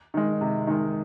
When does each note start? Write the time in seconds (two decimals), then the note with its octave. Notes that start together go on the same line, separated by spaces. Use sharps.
0.14 D#3 G#3
0.41 C3
0.67 D#3 G#3